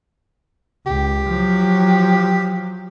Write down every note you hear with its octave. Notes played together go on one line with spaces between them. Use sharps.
C#2 G4
F3 F#3